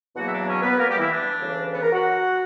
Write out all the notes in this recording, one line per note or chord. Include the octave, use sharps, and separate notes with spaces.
E2 B2 F#3 A#3 F#4 F#5
E5
D4 D5
C#4 C#5
B3 B4
A#3 A#4
G3 G4
E3 E4
D4
D2 C#3 E3
B3 B4
A#4 A#5
F#4 F#5